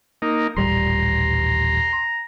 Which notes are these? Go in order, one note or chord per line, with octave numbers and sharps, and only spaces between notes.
A#3 D#4
D#1 A1 G3 A#5 C6